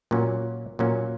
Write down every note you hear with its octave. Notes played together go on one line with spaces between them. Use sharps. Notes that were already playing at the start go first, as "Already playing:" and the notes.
A#2 F#3 A#3 C#4
A#2 F#3 A#3 C#4